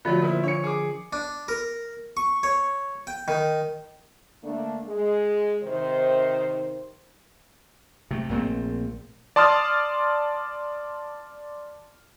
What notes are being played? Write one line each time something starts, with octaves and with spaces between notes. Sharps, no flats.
D3 F3 F#3 A3 F4 C#5
A#2 E4 A#4 C5
D4 C#5 C#7
G#4 D6
D4
A#4
C#6
C#5
G5
D#3
D3 A3 A#3 D4
G#3
C3 D#3 C5
C3 A3
A#1 A#2 A3 C4
D5 A5 C6 D#6 F6 A6